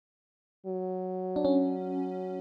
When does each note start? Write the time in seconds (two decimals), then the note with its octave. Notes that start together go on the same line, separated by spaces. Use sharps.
0.66 F#3
1.36 D4
1.45 C#4